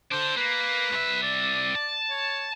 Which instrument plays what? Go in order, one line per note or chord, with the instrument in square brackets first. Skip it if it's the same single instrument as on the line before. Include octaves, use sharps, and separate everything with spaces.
[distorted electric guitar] D4 A4 [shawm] C5
[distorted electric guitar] A#3 [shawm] B4
[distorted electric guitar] C2 E5
[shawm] D5
[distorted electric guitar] A5
[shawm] C#5